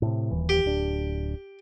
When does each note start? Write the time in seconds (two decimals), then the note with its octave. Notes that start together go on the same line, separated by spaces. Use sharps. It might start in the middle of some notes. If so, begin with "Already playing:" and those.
0.02 A2 C3
0.31 D#1 D#2 E3
0.49 G4
0.64 D1 D4